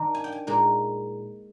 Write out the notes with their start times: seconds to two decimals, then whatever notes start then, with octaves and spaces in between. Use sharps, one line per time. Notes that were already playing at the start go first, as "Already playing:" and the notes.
Already playing: D#3 D4 A#5
0.15 G#5
0.24 G5
0.32 G#5
0.47 A#2 G#3 D#4